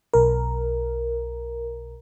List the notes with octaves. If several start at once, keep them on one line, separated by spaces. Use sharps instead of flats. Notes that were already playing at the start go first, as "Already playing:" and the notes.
B1 A#4